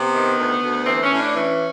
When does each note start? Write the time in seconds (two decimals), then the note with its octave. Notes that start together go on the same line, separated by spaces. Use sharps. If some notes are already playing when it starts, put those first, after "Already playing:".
Already playing: C3 B3
0.15 D#3
0.39 D2
0.63 D2
0.87 E3 C4
1.03 C#4
1.11 A2
1.19 D4
1.35 E3 C#4